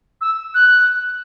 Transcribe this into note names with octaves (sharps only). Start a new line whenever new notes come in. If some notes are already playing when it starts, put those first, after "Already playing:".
E6
F#6